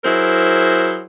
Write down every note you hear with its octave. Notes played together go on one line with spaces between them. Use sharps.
F#3 E4 G#4 A#4 C5